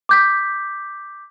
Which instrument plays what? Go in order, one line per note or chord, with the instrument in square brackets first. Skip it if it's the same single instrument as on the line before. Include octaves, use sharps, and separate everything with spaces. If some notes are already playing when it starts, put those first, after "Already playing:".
[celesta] D6 G6 B6